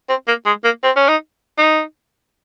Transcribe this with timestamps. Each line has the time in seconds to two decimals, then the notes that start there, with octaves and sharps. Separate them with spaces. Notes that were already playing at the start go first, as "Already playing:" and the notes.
0.09 C4
0.28 A#3
0.46 G#3
0.64 A#3
0.83 C4
0.96 C#4
1.09 D#4
1.58 D#4